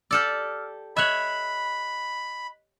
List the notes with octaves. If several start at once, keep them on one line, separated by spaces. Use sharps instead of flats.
G4 A4 D5 E6 F6
C#5 D#5 E5 B5 F#6 F#7